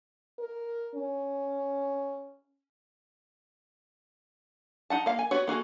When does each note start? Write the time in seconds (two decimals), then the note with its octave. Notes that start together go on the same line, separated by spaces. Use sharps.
0.39 A#4
0.95 C#4
4.90 D#4 F#5 A5
5.06 A#3 F5
5.19 G#5
5.31 B3 F#4 C#5
5.47 A#3 F#4 G#4 A4